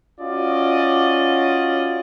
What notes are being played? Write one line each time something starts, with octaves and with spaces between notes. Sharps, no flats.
C#4 F4 F#4 D5 D#5